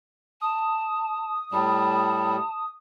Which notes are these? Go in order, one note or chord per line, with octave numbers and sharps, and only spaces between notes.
A5 D#6
A2 G3 A5